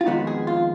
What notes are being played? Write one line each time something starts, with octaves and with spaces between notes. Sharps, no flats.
F4
F2 D#3 G#3 B3 D#4 F#4
G#4
F4